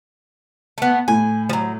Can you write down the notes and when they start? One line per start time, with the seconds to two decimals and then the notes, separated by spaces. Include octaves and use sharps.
0.78 A3 B3
1.08 A2 G#5
1.49 F3 F#3